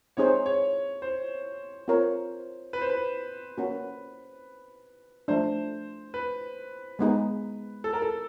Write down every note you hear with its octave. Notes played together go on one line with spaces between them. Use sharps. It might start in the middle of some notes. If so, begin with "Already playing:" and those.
C4 D#4 G#4 C5 C#5
C#5
C5
C4 F4 A#4 C#5
B4
C5
B4
A#3 C#4 F#4
F3 A3 D4 C5
B4
G#3 B3 D#4 G#4
A4
A#4
A4